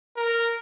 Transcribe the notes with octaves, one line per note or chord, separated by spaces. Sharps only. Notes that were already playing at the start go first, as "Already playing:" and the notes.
A#4